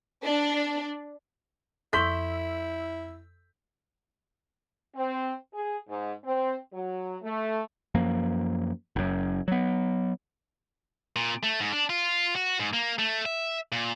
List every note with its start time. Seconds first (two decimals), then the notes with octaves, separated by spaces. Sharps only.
0.25 D4
1.93 F2 E4 A4 C6 C#6 E6 G6 B6
4.95 C4
5.53 G#4
5.87 G#2
6.24 C4
6.72 F#3
7.21 A3
7.95 F#2 F3 A#3
8.96 F#1 F#2
9.48 F#3 B3
11.16 A#2
11.43 A3
11.61 G#2
11.72 D4
11.89 F4
12.36 F#4
12.60 G#2
12.73 A#3
12.99 A3
13.26 E5
13.72 A#2